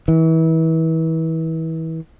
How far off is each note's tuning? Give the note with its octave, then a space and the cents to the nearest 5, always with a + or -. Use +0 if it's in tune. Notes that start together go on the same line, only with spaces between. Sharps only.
E3 -35